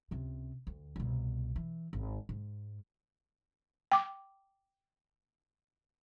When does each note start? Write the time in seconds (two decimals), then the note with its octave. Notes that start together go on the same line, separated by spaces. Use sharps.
0.11 C#2 C3
0.67 D2
0.96 C2 B2
1.56 E3
1.93 G#1
2.29 G#2
3.92 G5 D6